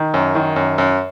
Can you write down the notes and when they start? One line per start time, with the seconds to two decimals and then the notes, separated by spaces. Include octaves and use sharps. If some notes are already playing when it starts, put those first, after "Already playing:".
Already playing: D#3
0.14 F#2
0.35 D#3
0.56 F#2
0.78 F#2